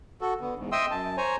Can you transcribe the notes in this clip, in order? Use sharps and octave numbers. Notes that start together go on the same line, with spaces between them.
F#4 A4
D3 B3
E2 G#2
D#5 E5 G5 C6 D#6 E6
F#2 A5
C5 C#5 G#5 A#5